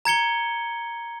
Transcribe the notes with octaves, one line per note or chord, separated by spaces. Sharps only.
A#5 G#6 C#7 G7